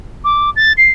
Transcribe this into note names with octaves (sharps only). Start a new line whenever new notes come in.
D6
A6
C7